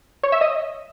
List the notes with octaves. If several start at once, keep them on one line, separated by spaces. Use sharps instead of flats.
C#5
E5
D#5